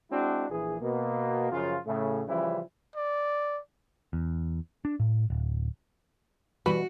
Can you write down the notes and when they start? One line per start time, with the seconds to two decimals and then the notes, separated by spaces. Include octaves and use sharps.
0.11 G#3 C4 D4 E4 F#4
0.51 A#1 E3 G#4
0.81 B2 A#3
1.51 F#2 C#3 F3 C#4 F4
1.86 A2 C#3 A3
2.28 C#3 E3 F3 G3 C#4 E4
2.96 D5
4.13 E2
4.85 D4
5.00 A2
5.30 D1
6.66 B2 E3 G3 F#4 B4